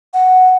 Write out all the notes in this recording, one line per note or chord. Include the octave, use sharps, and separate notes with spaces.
F#5